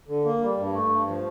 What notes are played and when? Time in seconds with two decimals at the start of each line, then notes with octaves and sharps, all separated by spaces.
0.08 D3
0.25 A#3
0.41 G3
0.57 G2
0.73 A3
0.90 G2
1.07 F3